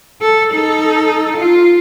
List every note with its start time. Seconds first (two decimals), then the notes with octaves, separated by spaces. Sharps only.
0.22 A4
0.53 D#4 A4
1.36 F4